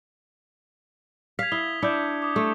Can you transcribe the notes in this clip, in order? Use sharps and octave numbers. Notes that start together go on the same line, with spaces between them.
F5 G#6 B6
E4 D#6 F7 G7
D4 E4 G6 B6 C#7
D6 D#6 B6
A3